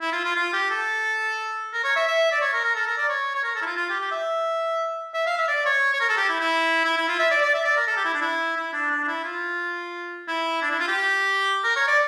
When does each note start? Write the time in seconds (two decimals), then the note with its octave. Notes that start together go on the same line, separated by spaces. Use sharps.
0.01 E4
0.12 F4
0.25 F4
0.36 F4
0.53 G4
0.70 A4
1.73 A#4
1.84 C#5
1.96 E5
2.07 E5
2.32 D5
2.41 C#5
2.53 A#4
2.64 A#4
2.75 A4
2.87 A#4
2.98 D5
3.09 C#5
3.35 C#5
3.44 A#4
3.55 A4
3.62 E4
3.66 F4
3.77 F4
3.90 G4
4.00 G4
4.11 E5
5.14 E5
5.26 F5
5.37 E5
5.48 D5
5.65 C#5
5.93 C#5
6.01 A#4
6.09 A4
6.17 G4
6.29 E4
6.40 E4
6.85 E4
6.97 E4
7.08 F4
7.19 E5
7.31 D5
7.42 D5
7.54 E5
7.65 D5
7.77 A#4
7.87 A4
7.97 G4
8.05 E4
8.14 D4
8.22 E4
8.56 E4
8.73 D4
8.91 D4
9.04 D4
9.08 E4
9.24 F4
10.28 E4
10.62 D4
10.71 E4
10.79 F4
10.87 G4
11.64 A#4
11.76 C#5
11.88 D5